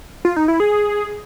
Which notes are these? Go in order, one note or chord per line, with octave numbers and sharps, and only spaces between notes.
F4
D#4
E4
G#4